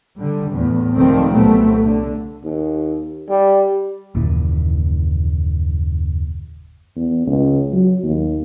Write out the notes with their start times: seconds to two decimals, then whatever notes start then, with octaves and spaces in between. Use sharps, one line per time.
0.17 D3 G3
0.51 E2 A2
0.95 C#2 D#3 F3 G3 A3 C4
1.33 C2 A#2 F#3 A3 B3 C4
1.83 D3
2.44 D#2
3.29 G3
4.15 F#1 D#2 A#2 E3
6.96 E2
7.27 C#2
7.72 F#3
8.03 D#2